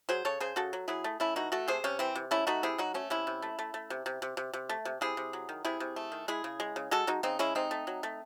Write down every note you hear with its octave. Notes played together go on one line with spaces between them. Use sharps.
F#3 G#4 C5
C#3 A4 C#5
C#3 G#4 C5
C#3 F#4 A4
F#3
F#3 E4 G#4
A3
A3 C#4 E4
E3 D#4 F#4
A3 F#4 A4
C3 G#4 C5
C3 C#4
E3 C4
C3
A3 C#4 E4
A3 D#4 F#4
C3 E4 G#4
F#3 D#4 F#4
A3 C#4
C3 C#4 E4
C3
A3
A3
A3
C3
C3
C3
C3
C3
A3
C3
C3 E4 G#4
C3
F#3
D#3
C3 E4 G#4
C3
A3
D#3
G#3 E4 G#4
C#3
G#3
C#3
G#3 F#4 A4
G#3 D#4 F#4
C#3 C4 D#4
G#3 C#4 E4
C3 C4 D#4
A3
F#3
A3